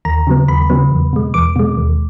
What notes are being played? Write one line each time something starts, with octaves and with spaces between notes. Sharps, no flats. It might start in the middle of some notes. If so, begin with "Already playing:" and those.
D#2 A#5
C#3 F#3 B3
D#2 B5
C#3 F#3 B3
E2
B2 G#3
E2 D6
B2 G#3
D#2